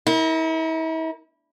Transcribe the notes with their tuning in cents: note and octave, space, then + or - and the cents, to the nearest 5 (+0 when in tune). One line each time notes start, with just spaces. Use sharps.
E4 -40 A#4 +0